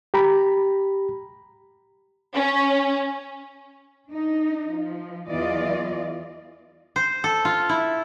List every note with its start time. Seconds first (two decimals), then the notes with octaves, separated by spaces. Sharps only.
0.14 G4 A#5 B5
2.35 C#4
4.07 D4 D#4
4.70 F3
5.29 E2 E3 F#3 F4 D5 D#5
6.96 C5
7.24 A4
7.45 F4
7.69 E4